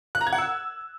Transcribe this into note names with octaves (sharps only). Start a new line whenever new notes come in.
F#6
A#5
G#6
F#5
E6